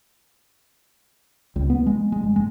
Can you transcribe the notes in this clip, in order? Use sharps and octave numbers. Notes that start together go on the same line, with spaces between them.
C#2
B3
G#3
G#3
G1
G#3